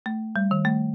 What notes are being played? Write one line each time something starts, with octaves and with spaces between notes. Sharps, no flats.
A3
G3
D#3
A3